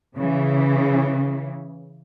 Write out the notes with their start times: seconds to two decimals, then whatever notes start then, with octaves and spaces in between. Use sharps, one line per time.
0.16 C#3 E3